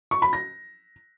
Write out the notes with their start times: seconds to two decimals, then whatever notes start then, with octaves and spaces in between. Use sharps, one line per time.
0.11 C#6
0.22 B5
0.33 A#6